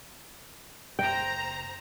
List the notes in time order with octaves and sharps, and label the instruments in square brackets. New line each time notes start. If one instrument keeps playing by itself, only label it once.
[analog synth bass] F#1 [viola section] C5 A#5 [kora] G5